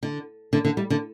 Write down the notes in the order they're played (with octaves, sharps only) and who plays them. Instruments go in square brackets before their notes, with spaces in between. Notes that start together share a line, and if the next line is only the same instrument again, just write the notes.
[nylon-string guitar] D3
D3
D3
G3
D3